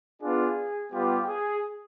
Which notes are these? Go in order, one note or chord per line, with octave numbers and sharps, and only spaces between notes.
B3 D4 F4 G#4
G3 B3 F4 G4
G#4